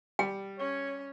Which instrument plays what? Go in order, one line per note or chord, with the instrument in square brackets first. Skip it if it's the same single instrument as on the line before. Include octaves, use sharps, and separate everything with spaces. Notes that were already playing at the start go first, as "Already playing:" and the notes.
[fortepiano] G3 [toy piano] G5
[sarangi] C#4 [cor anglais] C#5